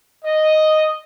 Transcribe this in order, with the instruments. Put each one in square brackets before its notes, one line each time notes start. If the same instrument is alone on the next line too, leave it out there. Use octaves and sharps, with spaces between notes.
[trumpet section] D#5